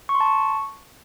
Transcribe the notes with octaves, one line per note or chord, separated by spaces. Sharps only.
C#6
C6
A5
C#6